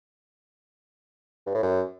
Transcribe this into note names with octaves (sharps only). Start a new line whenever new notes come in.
G2
A2
F#2